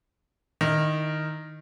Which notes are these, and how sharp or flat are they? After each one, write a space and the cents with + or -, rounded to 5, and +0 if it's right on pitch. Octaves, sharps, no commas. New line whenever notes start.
D#3 -10 E4 -25